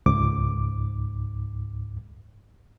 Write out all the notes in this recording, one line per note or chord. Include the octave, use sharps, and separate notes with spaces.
C#2 G#2 D6